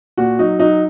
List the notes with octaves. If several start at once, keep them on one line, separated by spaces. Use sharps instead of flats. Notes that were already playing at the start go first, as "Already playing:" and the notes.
A#2 F#4
F#3 D#4
F#3 D#4